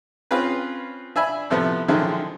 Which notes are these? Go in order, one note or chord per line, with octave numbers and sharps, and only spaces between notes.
C4 C#4 F4 G#4 B4
D4 E5 G#5 B5
A2 C3 F3 A3 B3
D3 D#3 F3 F#3 G#3 E4